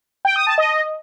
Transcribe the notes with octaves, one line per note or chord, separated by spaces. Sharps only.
G5
D#6
A5
D#5